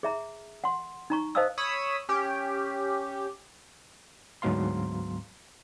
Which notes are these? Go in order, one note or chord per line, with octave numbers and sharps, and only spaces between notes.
G#4 E5 A#5
F#5 C6
D#4 A#5 C#6
C5 D#5 F5 A5 D#6 E6
C#5 B5 D#6 E6
C#4 G4
D2 G#2 F#3 B3 F5 C6